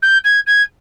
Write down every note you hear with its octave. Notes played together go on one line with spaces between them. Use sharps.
G6
G#6
G#6